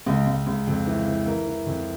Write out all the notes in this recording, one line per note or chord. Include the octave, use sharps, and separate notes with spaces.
C#2
C#2
C#2
F2
E3
E3
E3 A#4
E3
F2